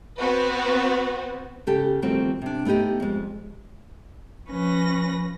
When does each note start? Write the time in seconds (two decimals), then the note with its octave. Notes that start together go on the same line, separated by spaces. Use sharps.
0.18 B3 C4 F#4 B4
1.67 C#3 G4 A4
2.02 D#3 F3 G3 A3 C4 F#4
2.42 C3 D4
2.65 A3 B3 D#4 G4 D#5
3.00 F2 G#3
4.48 F3 C#4 B4 A#6